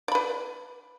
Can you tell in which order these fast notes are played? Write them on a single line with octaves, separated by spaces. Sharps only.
D5 B5 B4